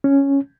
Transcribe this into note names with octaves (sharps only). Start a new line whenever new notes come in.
C#4